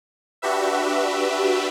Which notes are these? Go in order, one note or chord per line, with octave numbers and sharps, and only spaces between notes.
D4 F#4 G4 B4 E5